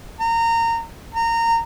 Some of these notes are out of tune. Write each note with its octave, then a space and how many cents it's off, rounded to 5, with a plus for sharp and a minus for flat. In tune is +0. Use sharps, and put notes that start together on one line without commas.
A#5 -25
A#5 -20